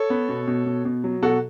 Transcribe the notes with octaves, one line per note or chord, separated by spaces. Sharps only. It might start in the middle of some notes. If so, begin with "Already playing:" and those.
Already playing: A4 C#5
B3
B2
B2
B2
B2
F#3
B2 F#4 A4